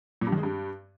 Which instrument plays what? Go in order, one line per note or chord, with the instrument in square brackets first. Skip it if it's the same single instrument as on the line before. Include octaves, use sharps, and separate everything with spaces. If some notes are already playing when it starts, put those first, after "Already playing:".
[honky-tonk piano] A#2
G2
D#3
G#3
G2